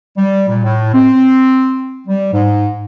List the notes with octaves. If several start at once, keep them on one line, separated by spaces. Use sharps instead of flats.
G3
A#2
A2
C4
G3
G#2